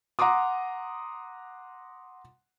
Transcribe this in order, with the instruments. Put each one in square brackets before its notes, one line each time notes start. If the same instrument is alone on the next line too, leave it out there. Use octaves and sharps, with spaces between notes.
[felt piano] F#5 A#5 C6 D6 D#6